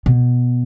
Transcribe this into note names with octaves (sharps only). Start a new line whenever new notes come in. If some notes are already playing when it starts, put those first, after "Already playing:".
B2